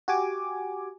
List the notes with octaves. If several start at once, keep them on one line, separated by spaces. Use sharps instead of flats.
F#4 G4 G#5 D6